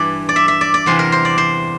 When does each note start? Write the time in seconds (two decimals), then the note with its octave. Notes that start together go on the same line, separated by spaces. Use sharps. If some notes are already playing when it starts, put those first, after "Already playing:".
Already playing: G2 E3 D5
0.29 D5
0.36 E5
0.48 E5
0.61 D5
0.74 D5
0.86 E2 C3 E3 C5
0.99 A#4
1.12 C5
1.25 D5
1.38 C5